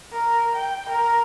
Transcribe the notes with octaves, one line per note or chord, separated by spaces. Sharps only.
A#4
G5
A#4